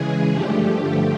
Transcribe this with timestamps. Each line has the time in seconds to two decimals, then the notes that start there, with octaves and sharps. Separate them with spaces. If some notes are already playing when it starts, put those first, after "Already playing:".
Already playing: C#3 E3 G#3 G#4
0.33 G2 D3 F3 A3 G4